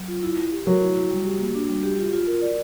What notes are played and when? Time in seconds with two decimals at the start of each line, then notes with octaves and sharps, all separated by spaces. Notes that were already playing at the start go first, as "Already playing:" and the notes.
Already playing: F#3
0.08 F4
0.23 E4
0.37 E4
0.52 G4
0.66 F#3 A#4
0.81 E4
0.96 E4
1.10 G3
1.25 G4
1.39 A#3
1.55 D4
1.68 G3
1.83 G4
1.98 F4
2.13 F4
2.27 A#4
2.42 D5